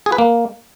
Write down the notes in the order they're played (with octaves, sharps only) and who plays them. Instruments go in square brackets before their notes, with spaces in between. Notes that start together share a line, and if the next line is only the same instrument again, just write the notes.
[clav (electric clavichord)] G#4
B4
A#3